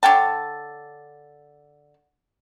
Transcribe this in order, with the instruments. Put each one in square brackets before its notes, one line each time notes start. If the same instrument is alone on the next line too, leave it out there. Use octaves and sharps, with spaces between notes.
[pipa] D3 C#5 G5 A5